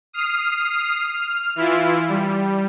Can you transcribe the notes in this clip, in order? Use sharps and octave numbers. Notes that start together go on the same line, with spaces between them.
D#6 F6 C7
F6
E3 E4 F4
G3